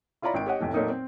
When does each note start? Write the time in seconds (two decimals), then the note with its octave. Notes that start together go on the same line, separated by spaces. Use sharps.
0.22 E4 F4 C#5 D5 A#5 B5
0.34 G#1 D#3 G5 D7
0.46 G4 C#5 D#5 F#5
0.60 F1 F2 A2
0.73 A#2 F#3 A3 A#3 D#4 A#4
0.89 C4